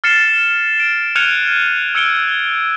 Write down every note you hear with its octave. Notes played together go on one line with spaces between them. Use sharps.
F6 A6 C7 C#7 E7
D7
F6 F#6 G#6 C#7 D#7 F7
E6 G#6 C#7 D7 G7